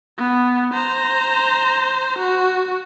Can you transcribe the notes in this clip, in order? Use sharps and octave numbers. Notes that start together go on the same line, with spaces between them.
B3
C5 A#5
F#4